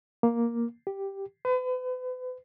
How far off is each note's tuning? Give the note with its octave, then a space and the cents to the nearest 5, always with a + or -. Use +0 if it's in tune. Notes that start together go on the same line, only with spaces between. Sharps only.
A#3 +5
G4 +0
B4 +40